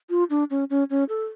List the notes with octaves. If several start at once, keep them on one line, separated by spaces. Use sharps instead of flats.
F4
D4
C#4
C#4
C#4
A4